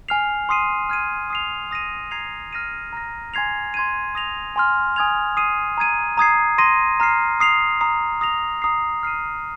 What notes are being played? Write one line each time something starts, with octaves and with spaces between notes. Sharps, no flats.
G#5 F6 C7 F7
C6 D#6 C7 D#7
F6 G#6 D#7
D#6 C7 F7
D#6 A#6 D#7
A#5 G#6 C7 F7
F6 A#6 D#7
A#5 F6 A#6
G#5 C6 G#6 C7 F7
C6 G#6 D#7
D#6 A#6 F7
G#5 C6 F6
G#5 D#6 G#6 F7
D#6 C7 D#7
A#5 G#6 D#7
A#5 D#6 G#6 C7
C6 D#6 A#6 D#7
A#5 F6 C7
D#6 C7 F7
A#5 D#6 C7
D#6 A#6 F7
A#5 D#6 C7
F6 C7 D#7